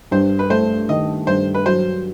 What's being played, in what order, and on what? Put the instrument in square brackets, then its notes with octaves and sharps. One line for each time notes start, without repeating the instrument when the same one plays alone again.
[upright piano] G2 [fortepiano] C5
[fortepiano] B4
[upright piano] A3 [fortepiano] C5
[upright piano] D#3 [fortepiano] D#5
[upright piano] G2 [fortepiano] C5
[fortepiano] B4
[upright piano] F#3 [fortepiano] C5